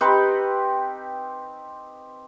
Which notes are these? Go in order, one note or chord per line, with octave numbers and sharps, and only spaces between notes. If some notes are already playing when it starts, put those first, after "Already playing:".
C4 D#4 G4 B4